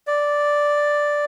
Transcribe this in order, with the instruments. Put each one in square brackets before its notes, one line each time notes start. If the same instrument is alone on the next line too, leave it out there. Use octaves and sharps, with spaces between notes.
[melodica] D5